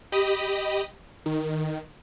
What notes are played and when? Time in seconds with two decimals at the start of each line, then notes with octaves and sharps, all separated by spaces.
0.12 G4 D#5 B5 D#6
1.26 D#3